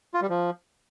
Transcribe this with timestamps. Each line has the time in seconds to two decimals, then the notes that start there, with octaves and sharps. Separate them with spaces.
0.14 F4
0.22 G3
0.30 F3